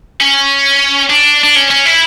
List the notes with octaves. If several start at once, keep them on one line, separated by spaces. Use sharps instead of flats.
C#4
D4
D4
C#4
C#4
E4